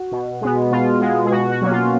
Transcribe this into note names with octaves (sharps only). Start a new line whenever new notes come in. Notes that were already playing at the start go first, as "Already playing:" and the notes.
Already playing: F#4
B2
G#3 B3
B2 F4
G#3 B3
G#4
B2 F#4
F#4
F#3 A#3 C#4 F#4
F4